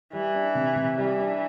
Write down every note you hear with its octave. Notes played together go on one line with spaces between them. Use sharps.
E3 G3
D4
C3
C3
E3 G3
D4